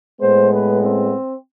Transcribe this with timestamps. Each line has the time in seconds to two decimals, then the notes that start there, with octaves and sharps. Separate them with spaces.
0.21 A2 G#3 B3 C5
0.50 B4
0.79 C4